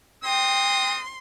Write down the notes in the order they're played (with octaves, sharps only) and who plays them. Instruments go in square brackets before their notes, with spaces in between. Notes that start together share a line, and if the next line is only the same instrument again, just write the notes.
[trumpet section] G#3 C4 D#6 [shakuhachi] G5 [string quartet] C6